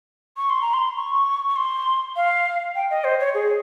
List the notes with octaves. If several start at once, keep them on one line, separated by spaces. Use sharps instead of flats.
C#6
C6
A#5
C6
C#6
C#6
C6
F5
G5
D#5
C5
C#5
G#4